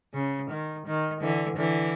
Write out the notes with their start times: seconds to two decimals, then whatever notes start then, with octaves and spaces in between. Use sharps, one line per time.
0.14 C#3
0.50 D#3
0.86 D#3
1.21 D3 E3
1.57 D3 E3